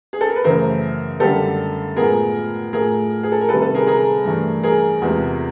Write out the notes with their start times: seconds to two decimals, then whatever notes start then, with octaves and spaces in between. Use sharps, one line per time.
0.13 G#4
0.21 A4
0.28 A#4
0.36 B4
0.44 F#2 C#3 E3 A3 A#4 C5
1.20 F#2 D3 G3 A#3 G4 A4
1.97 A2 F3 G#3 B3 G#4 A#4
2.73 A2 F3 A3 G#4 A#4
3.23 G#4
3.32 A4
3.41 A#4
3.49 C3 D#3 G3 A#3 A4 B4
3.62 A4 B4
3.75 G#4 A#4
3.87 G#4 A#4
4.25 G2 E3 A3
4.63 G#4 A#4
5.02 E2 C3 F3 G#3 B3